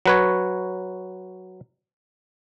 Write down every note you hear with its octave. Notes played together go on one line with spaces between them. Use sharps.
F#3 B4 C#5